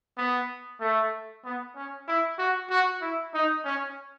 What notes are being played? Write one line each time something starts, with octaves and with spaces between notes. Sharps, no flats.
B3
A3
B3
C#4
E4
F#4
F#4
E4
D#4
C#4